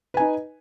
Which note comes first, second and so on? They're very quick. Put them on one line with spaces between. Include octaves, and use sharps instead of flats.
B4 G#5 D#4